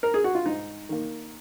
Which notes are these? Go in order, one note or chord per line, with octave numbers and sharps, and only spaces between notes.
A#4
G#4
F#4
F4
G#2 D#4
D#3 A#3